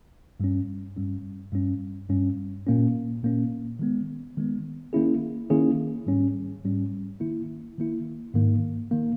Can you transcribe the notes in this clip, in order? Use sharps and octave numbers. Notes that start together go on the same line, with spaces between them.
G2 G3 C#4
G2 G3 C#4
G2 G3 C#4
G2 G3 C#4
A#2 A#3 C#4
A#2 A#3 C#4
D#3 G#3 B3
D#3 G#3 B3
D#3 A#3 C#4 E4 G#4
D#3 A#3 C#4 E4 G#4
G#2 G3 C#4
G#2 G3 C#4
D#3 A#3 E4
D#3 A#3 E4
G#2 D#3 A#3
D#3 A#3